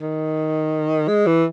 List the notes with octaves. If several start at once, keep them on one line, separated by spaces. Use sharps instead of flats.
D#3
G#3
E3